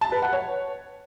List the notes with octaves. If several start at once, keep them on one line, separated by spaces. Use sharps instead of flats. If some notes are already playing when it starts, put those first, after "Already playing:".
A5
B4
F#5
C#5